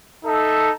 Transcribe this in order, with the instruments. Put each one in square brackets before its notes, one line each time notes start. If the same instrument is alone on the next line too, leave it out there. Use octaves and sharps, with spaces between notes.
[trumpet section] D#4 A4 E5